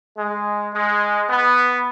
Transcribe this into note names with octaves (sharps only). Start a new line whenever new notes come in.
G#3
G#3
B3